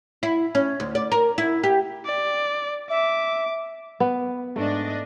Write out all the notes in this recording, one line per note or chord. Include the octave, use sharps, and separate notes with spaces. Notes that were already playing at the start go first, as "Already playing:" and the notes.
E4
C#4
D2
D5
A#4
E4
G4
D5
E5 D6
B3
G#2 A3 D4 D#5